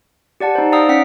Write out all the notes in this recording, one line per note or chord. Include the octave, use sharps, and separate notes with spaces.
G4 D5 F#5 A5
D#4 C5
D5 F5 G5 A#5 D#6 E6
C#4 F#5 G5 B6